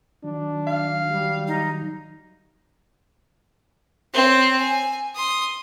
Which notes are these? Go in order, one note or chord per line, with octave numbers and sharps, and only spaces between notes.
D#3 F#3 D4
F5
G3
D#4
C4 C#5
G#5
C6 D#6